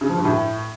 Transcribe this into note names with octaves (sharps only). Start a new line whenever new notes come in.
C#3
F3
G2
A2